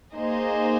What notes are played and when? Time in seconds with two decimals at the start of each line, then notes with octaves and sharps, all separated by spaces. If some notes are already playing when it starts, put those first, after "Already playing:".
0.14 A#3 D#4 G#4 C5 D#5